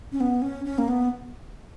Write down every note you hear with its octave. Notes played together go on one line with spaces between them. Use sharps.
C#4
B3
C#4
C#4
A#3
B3